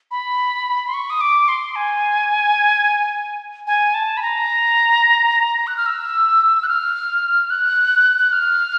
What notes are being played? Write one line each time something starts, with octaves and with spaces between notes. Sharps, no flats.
B5
C6
C#6
D#6
D6
C6
G#5
G#5
A5
B5
A#5
F#6
F6
E6
F#6
F6
F#6
F#6
F6